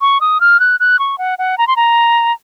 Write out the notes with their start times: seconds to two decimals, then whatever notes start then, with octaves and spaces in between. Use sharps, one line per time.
0.01 C#6
0.21 D#6
0.41 F6
0.60 F#6
0.80 F#6
0.99 C#6
1.18 F#5
1.39 F#5
1.58 A#5
1.68 C6
1.76 A#5